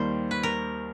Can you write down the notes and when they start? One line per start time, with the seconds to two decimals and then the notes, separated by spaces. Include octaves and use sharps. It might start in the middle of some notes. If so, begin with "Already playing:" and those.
Already playing: D#2 D#3 G3 C5
0.31 B4
0.43 A#4